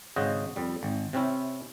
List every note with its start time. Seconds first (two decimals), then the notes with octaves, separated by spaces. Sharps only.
0.16 G#1 C#3 F#4 C5 D#5
0.56 F2 G3
0.83 G#1
1.13 C3 C4 C#4 E4